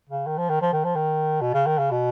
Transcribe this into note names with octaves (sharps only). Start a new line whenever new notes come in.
C#3
D#3
F3
D#3
F3
D#3
F3
D#3
B2
C#3
D#3
C#3
B2